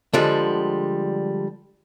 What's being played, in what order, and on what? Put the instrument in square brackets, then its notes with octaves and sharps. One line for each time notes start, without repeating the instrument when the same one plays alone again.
[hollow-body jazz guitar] D3 F3 G3 G#3